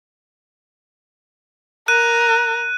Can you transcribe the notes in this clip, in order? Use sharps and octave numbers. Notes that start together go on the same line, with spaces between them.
A#4 F#6 D#7